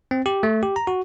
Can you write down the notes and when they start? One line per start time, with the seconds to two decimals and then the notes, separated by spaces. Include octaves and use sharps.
0.11 C4
0.26 G4
0.43 A3
0.63 G4
0.76 A#5
0.87 F#4